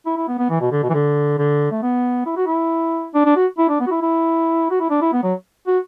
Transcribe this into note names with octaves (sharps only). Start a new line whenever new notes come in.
E4
E4
B3
B3
E3
B2
D3
B2
E3
D3
D3
A3
B3
E4
F#4
E4
D4
D4
F#4
E4
D4
B3
F#4
E4
E4
F#4
E4
D4
E4
B3
F#3
F#4